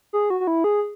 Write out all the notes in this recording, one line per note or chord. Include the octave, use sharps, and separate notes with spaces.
G#4
F#4
F#4
E4
G#4